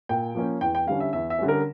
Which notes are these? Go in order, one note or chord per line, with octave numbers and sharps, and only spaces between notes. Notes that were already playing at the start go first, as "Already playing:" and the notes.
A#2 G5
F3 A#3 C#4
E2 G5
G5
D3 G3 C#4 F5
E5
E2 E5
E5
D3 G3 C#4
A#4